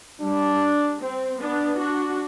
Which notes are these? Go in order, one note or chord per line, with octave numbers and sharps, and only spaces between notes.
G3 D4
C4
B3 D4
D4 F#4